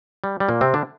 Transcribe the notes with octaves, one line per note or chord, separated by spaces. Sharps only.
G3
G3
A#2 A#3
C3 C4
D3 D4